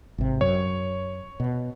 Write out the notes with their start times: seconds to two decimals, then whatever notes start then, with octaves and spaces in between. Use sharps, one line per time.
0.18 G#1 C3
0.41 F#2 C#5
1.40 B2